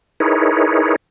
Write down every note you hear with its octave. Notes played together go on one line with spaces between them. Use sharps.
D#4 E4 G#4 A#4 B4 C#5